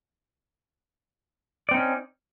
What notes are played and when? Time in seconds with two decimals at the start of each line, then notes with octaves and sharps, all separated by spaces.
1.69 D5
1.71 C4
1.74 D#4
1.77 C#4